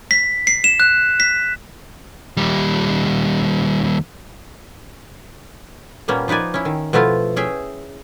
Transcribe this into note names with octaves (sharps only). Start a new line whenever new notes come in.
B6
C7
E7
F#6
B6
D#2 G3
A#2 G3 A#3 B3 C#4
F3 D#4 B4 D5 G#5
C#4 E4
D#3
B2 F3 A3 B3 E4 F4
C#4 G#4 E5 G5